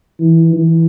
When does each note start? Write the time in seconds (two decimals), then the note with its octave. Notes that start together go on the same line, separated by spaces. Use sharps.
0.20 E3
0.53 E3